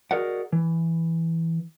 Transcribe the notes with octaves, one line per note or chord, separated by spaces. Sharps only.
F#4 G#4 A#4 D5 D#5 F#5
E3